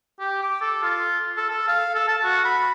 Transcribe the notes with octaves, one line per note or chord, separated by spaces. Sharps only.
G4
D6
A4
F4
A4
A4
F5
A4
A5
F#4
B5